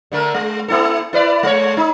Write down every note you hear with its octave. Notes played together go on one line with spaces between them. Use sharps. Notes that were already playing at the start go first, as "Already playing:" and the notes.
D3 A3 A#4
G#3
A#3 E4 A4
E4 B4 D5
G#3 C#5
D#4